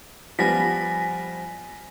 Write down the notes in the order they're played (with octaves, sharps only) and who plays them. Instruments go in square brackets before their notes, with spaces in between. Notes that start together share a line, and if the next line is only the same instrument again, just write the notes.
[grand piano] F3 G3 B3 [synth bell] G#5 A#6 B6